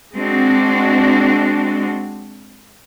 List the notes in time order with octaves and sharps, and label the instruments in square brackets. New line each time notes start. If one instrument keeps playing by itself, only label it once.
[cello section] G#3 C4 D4 F#4